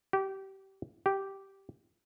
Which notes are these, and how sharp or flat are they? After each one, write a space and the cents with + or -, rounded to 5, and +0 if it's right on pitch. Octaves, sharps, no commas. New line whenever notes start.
G4 -25
G4 -10